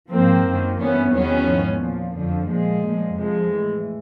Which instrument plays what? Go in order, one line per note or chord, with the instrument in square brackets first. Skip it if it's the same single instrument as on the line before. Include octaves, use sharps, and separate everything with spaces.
[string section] G#2 F3 A#3 C4
F#2 D#3 F#3
G2 E3 B3 C#4
E2 C3 D#3 F#3 B3 C#4
G#2 F3
A#2 F3
F2 D3 F3
A#2 F3 G#3
A#2 F3
F2 C3 F3 G#3
A2 E3